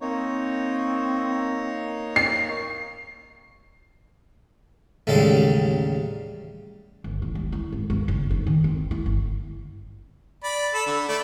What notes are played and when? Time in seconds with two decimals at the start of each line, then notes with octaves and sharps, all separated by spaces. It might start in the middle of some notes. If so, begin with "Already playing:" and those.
0.01 A#3 C4 D#4 C#5
2.16 C7
5.07 A1 D#2 C#3 G3 G#3 A4
7.04 G1
7.22 E3
7.35 G3
7.52 E4
7.72 G#1
7.90 G2
8.08 F#1
8.30 D#4
8.47 D#3
8.64 C4
8.91 E4
9.06 G1
10.44 D5 B5
10.74 A4 B5
10.87 D3
11.08 A3 D5